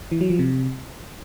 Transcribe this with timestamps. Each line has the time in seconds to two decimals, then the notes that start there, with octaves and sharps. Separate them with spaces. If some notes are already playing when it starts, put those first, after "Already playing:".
0.12 E3
0.21 F#3
0.30 F3
0.39 C3